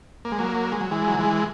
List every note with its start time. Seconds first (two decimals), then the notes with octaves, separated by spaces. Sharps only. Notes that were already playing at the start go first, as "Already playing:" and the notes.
0.25 A#3
0.32 G#3
0.39 F#3 A#3
0.72 G#3
0.81 F#3
0.91 E3 G#3
1.08 F#3
1.19 E3 G#3